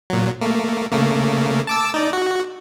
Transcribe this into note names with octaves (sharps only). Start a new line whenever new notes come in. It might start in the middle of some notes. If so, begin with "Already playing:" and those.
A#2 F#3
A3 A#3
C#3 A3 A#3
A5 D6 E6
D#4 D5
F#4